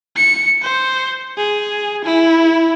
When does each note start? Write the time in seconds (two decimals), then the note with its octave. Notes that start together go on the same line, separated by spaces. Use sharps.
0.16 C#7
0.62 C5
1.37 G#4
2.04 E4